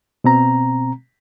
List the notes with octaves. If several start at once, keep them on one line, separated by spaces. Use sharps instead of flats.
B2 C4 A#5